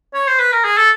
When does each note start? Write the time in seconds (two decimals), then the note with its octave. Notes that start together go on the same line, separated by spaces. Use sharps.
0.14 C#5
0.27 C5
0.39 B4
0.52 A#4
0.65 G#4
0.77 A4